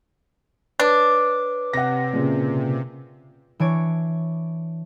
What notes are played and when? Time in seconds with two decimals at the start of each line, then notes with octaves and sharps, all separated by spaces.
0.80 D4 B4 C#5 D6
1.73 C3 F#5 A#6
2.13 A#2 C#3
3.60 E3 D4 C#5 D7